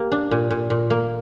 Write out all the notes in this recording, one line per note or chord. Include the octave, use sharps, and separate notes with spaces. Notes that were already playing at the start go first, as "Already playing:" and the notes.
Already playing: A#3 G4
D4
A#2
A#2
A#2
A#3